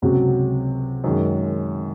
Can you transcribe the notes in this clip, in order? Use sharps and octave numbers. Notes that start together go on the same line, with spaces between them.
C#2 C3 F#3 C#4 F#4
F#2 D#3 G#3